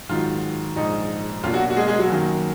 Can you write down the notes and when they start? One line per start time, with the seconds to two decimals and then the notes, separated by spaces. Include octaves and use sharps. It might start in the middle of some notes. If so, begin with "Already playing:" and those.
0.09 G#2 D#3 F#3 F4
0.76 A#1 G#2 F3 D#4
1.43 B1 B2 A#3 D4 F4
1.54 F#3 F#4
1.70 F#4
1.77 G#3 G#4
1.87 G#3 G#4
1.99 F#3 F#4
2.10 F#2 D#3 A#3